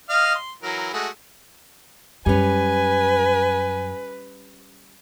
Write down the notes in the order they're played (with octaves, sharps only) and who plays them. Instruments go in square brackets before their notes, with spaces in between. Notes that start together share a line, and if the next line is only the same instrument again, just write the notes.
[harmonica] D#5 F5 F6
C6
E3 F#3 A#4
G#3 A3 F#4
[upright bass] F#2 [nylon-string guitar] G3 C#4 [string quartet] B4 [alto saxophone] G#5